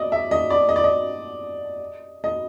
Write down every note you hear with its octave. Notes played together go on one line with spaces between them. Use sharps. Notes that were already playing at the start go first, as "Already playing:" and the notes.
Already playing: D5 D#5
E5
D#5
D5
D#5
D5
D#5
D#5